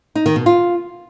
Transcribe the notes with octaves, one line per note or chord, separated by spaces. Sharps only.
D#4
D#3
B2
F4